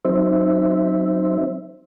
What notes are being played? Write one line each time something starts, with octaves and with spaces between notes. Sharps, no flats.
F#3 C4 D#4 C5 E5